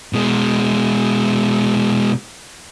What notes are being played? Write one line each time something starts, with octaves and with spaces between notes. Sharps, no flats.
B2 G#3